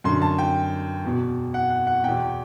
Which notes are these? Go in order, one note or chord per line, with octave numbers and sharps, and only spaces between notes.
F#2 D3 C6
A5
G5
E2 B2
F#5
F#5
F#5
E2 B2 G5